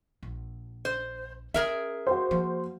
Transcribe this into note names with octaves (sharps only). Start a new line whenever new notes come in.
A#1
C5
C#4 G#4 A#4 E5
F#4 C5
F3 A#3